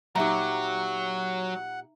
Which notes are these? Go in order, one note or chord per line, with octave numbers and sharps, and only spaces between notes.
A#2 F#3 D#4 G4 E5 F#5 A#5